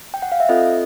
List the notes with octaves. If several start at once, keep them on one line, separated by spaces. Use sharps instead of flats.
G5
F#5
F5
E5
C4 F4 A4 D#5